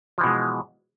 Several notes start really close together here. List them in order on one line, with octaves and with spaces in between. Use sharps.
F3 E3 B2 G#3